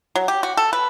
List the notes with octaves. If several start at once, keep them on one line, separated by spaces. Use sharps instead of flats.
F#3
G4
F#4
A4
B4